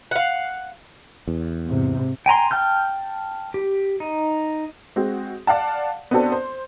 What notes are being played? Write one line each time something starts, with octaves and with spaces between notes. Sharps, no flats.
F5 F#5
E2
G#2 C3
G5 G#5 A#5 C6
G5 A5 F6 G6
G4
D#4
G#3 C4 F#4
D5 F5 F#5 A5
B3 C4 D4 F#4 A4 C5
C5